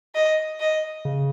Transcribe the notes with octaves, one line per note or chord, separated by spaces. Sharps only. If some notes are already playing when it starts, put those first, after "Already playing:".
D#5
D#5
C#3